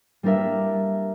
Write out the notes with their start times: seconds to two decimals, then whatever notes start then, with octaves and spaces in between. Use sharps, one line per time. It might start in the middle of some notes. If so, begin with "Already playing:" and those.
0.23 G3 A#3 D4 A#4 E5